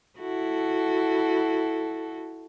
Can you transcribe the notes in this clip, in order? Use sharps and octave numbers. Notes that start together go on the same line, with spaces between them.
E4 F#4 A4